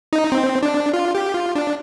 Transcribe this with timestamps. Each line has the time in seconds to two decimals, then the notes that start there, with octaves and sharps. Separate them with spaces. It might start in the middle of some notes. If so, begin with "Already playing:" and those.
0.13 D#4
0.32 C4
0.63 D4
0.93 F4
1.15 G4
1.34 F4
1.55 D4